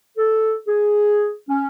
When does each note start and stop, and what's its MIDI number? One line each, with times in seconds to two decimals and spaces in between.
0.17 0.54 69
0.66 1.31 68
1.47 1.67 61